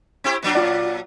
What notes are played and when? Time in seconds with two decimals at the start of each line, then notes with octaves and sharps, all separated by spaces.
0.24 C4 E4 G4
0.43 A#2 F#3 D4
0.55 F4 D5